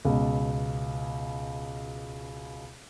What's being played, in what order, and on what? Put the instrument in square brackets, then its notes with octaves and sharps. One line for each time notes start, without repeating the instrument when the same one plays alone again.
[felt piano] C#2 B2